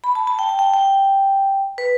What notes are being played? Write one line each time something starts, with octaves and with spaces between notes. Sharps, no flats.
B5
A5
A5
G5
A5
G5
G5
B4